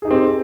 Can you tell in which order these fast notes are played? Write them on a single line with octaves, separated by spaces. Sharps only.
G#4 D#4 G4 C4